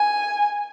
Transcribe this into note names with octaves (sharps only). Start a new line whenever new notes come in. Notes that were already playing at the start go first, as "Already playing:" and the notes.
Already playing: G#5